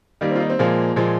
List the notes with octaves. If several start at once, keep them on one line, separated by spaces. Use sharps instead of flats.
D#3 G3 A#3
C4
F4
D#4
C4
A#2 F3 G#3 A#3
A#2 F3 G#3